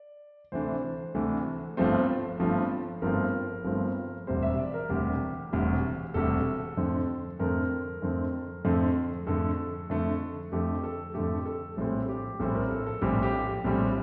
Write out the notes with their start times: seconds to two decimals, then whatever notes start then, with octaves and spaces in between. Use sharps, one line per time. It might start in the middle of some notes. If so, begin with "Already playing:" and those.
Already playing: D5
0.52 D2 C3 E3 A3 D4 C5
1.15 D2 C3 E3 A3 D4
1.77 G1 G2 F3 A3 C4
2.40 G1 G2 F3 A3 C4
3.02 G1 G2 F3 A3 C4 A#4
3.65 G1 G2 F3 A3 C4
4.27 E1 D2 C3 G3 C5
4.43 E5
4.58 D5
4.74 A#4
4.89 E1 D2 C3 G3 G4
5.52 E1 D2 C3 G3
6.14 E1 D2 C3 G3 A4
6.77 F2 D3 A3 C4
7.39 F2 D3 A3 C4 A#4
8.02 F2 D3 A3 C4
8.64 F2 D3 A3 C4
9.27 F2 D3 A3 A4
9.90 F2 D3 A3
10.52 F2 D3 A3 G4
10.83 A4
11.14 F2 D3 A3 G4
11.46 A4
11.77 A#1 A2 G3 C4 A4
12.08 G4
12.40 A#1 A2 G3 C4 A4
12.55 A#4
12.71 A4
12.86 A4
13.02 A#1 A2 G3 C4 G4
13.23 G4
13.64 A#1 A2 G3 C4